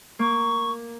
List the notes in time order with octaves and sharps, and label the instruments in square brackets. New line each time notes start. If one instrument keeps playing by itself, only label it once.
[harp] A#3 [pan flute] C#6